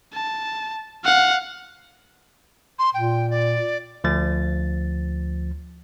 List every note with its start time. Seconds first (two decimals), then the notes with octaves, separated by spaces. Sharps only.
0.13 A5
1.04 F5 F#5
2.79 C6
2.94 A#2 G5
3.30 D5
4.04 D2 F3 A6